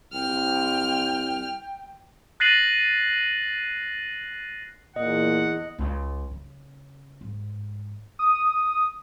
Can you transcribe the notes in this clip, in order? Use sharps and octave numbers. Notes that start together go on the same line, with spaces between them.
C2 G5 F6
F#6 A6 A#6 C7 D#7 F#7
E2 A#2 D#5 F#5
C#2
C#3
G#2
D#6